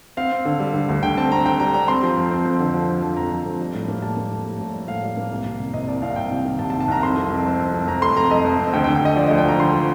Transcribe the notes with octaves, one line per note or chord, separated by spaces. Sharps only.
C4 F5
C4
D3
G3
D3
D2
D3 G5
C4 A5
C4 A#5
D3 G5
G3 A#5
G3 A#5
C4 C6
F3
F2
C4
F2
D3
F3
C4
F3
F2 A#5
F3
F2
G3
A2
A#3
G3 A5
A#3
A2
G3
A2
G3
A2 F5
G3
A#3
C2
C2
C3
C3 D#5
C2 D5
C2 F5
C3 G5
C2
D#3
C3 A5
A5
C2
A5
C2 A#5
F2 C6
F2
F2
C4
F2
F2
F2 A#5
A3 C6
F2 A#5
F2 D#5
F2
C4
D2 G5
G5
D3
G5
D3 D#5
F3 D5
D2 D#5
G5
F3 A#5
D3 C6
F3